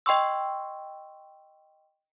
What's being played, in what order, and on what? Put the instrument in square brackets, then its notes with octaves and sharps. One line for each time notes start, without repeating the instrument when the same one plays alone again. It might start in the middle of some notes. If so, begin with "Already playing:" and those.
[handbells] D#5 G5 C6 C#6 E6